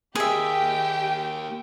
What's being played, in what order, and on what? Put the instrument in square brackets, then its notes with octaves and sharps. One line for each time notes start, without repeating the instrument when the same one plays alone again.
[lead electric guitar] A#3 D#4 [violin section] G4 G5 [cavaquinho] G#4 E5